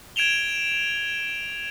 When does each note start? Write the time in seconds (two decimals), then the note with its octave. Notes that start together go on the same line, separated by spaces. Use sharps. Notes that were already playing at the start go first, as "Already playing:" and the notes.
0.16 G#6 D7 E7 F7 G7